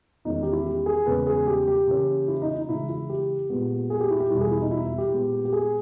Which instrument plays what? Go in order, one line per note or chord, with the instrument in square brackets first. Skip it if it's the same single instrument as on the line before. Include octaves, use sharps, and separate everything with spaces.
[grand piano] E2 D#3 G#3 C#4 D#4
G4
E4
G4
G#4
E2 C#3 G#3 C#4 B4
G#4
G4
G4
C#3 E3 A#3 C#4
E4
D#4
D#4
C#3 E3 G#3 E4
E4
G4
A#2 G#3 B3
G#4
G4
E4
G4
E2 B2 G3 E4
G#4
E4
D#4
E4
E4
G4
A#2 G#3 B3
G4
G#4